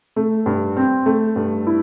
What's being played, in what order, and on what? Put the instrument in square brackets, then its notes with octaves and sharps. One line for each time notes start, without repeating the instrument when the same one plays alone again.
[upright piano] A3
G2
C4
A3
G2
E4